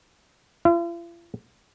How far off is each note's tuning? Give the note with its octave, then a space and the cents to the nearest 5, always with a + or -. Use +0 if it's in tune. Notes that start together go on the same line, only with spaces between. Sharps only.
F4 -45